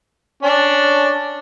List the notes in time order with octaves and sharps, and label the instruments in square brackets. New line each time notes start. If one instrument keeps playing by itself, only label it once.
[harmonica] C#4 D4 D5